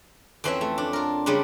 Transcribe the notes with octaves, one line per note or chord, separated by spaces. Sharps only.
F2 E3 C4 C#4 C5 E5
A3
D4
F4 A#4
C#3 G3 G#3 D4